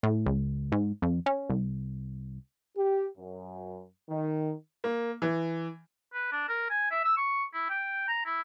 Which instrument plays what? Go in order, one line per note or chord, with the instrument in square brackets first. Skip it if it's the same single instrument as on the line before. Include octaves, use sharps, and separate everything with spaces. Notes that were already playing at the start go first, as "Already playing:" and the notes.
[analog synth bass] A2
C#2
G#2
F2
C#4
C2
[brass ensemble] G4
F#2
D#3
[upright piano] A#3
E3
[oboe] B4
D4
A#4
G#5
E5
E6
C#6
E4
G5
A#5
E4